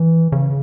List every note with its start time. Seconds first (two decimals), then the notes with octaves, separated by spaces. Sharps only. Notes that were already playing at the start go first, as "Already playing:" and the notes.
Already playing: E3
0.32 C#3